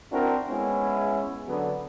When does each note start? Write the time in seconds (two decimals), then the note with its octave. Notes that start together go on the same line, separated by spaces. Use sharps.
0.12 C4 D4 E4 F#4 A#4
0.50 G#3 B3 C#4 E4
1.48 D3 F#3 B3